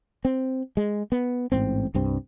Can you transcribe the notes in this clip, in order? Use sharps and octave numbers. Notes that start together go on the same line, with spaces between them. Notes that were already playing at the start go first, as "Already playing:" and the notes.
C4
G#3
B3
A1 G#2 C4
C2 G2 C4